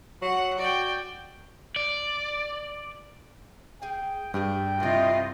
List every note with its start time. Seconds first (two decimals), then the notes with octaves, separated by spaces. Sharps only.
0.22 F#3 F#5
0.59 F#4 D5 G5
1.76 D5
3.82 G#4 F5 G5
4.34 G2 D4 G4 G#4 G5
4.80 C3 A3 E4 F4 D#5